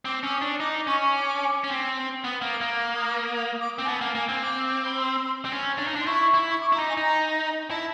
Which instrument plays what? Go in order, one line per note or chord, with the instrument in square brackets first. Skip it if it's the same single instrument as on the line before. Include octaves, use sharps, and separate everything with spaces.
[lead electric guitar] C4 [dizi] D6
[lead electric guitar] C#4 [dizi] D6
[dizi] D#6
[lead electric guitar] D4
[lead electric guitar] D#4 [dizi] D6
[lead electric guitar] C#4 [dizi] C#6
[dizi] D6
[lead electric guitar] C#4
C4
[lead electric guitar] B3 [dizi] D#6
[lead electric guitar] A#3
[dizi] D6
[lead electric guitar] A#3
[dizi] D6
D#6
D6
D#6
D6
[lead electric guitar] C4
[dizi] G#5
[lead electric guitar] B3 [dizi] A5
[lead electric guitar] A#3
[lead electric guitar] A#3 [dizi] G#5
[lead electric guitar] C4
[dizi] D6
B5
C6
[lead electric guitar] C4
C#4
D4
D#4
D4
[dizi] C6
[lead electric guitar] E4 [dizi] C#6
[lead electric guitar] E4
[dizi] C#6
D6
[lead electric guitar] E4 [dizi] A#5
[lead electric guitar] D#4
[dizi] G#5
[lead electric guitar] D#4 [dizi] A#5
[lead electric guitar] E4 [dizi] A5